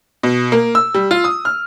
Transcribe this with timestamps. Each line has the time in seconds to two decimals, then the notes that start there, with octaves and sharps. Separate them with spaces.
0.23 B2
0.52 A#3
0.75 E6
0.95 G3
1.11 F4
1.24 D#6
1.45 F6